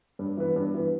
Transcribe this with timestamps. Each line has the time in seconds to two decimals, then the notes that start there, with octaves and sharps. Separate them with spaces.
0.19 G2
0.37 E3 B3
0.56 G2
0.74 E3 B3